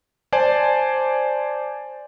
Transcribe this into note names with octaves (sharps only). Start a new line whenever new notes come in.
C5 D5 G#5 A5